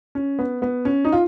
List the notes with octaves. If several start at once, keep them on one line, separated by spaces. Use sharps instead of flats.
C#4
B3
B3
C#4
D#4
F4